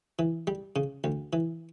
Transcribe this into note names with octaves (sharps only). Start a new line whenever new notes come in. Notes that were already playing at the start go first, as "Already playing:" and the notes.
E3
G3
C#3
D2
E3